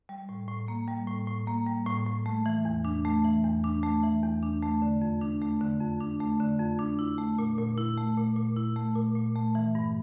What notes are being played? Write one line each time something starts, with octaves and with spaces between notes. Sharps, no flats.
G3
A2
A2
A#3
G3
A2
A2
A#3
G3
A2
A2
A3
E3
E2
D4
A3
E3
E2
D4
A3
E3
E2
D4
A3
D3
F2
D4
A3
D3
F2
D4
A3
D3
F2
D4
E4
A3
A#2
A#2
E4
A3
A#2
A#2
E4
A3
A#2
A#2
A3
E3
G2